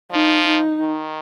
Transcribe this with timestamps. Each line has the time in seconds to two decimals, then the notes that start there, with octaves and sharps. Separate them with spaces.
0.11 F3 D#4
0.47 D#4
0.81 D#3